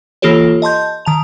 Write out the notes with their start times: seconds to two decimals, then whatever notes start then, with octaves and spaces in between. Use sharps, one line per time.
0.22 E3 A#3 F4 G4 A4 C#5
0.62 D#5 A5 C6 G6
1.05 D#3 A5 F7